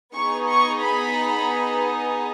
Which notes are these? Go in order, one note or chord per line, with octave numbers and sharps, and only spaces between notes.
B3 D#4 G#4 C#6
C#6
B5